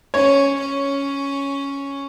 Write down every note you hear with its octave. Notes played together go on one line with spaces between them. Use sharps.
C#4 C#5
C#4